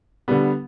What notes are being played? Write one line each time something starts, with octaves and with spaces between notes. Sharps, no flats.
D3 G3 B3